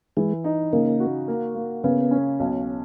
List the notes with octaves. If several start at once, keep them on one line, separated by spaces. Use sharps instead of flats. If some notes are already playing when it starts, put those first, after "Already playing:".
E3 G#3
D#4
C#3 A#3
F#4
A#3
A#3
C#3 B3
C#4
B1